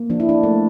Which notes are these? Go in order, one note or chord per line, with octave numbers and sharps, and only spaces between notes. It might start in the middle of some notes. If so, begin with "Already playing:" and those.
Already playing: A#3
F3 D4
E4
D4
A3